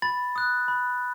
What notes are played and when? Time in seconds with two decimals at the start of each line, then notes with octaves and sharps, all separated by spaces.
0.02 B5 A6
0.36 D#6 F#6
0.68 B5